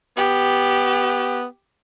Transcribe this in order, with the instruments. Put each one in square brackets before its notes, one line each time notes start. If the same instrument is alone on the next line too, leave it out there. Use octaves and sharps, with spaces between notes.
[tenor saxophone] B3 [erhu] G4